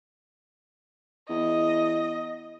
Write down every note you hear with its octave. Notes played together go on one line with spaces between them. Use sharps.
E2 D#5